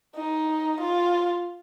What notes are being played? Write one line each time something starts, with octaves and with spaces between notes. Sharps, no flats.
D#4
F4